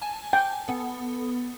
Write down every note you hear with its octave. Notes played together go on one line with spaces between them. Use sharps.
G#5 A5
G5
B3 A4